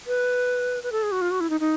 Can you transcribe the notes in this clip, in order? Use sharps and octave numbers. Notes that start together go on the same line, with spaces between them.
B4
B4
A4
G#4
F#4
F4
F#4
E4
D#4
D#4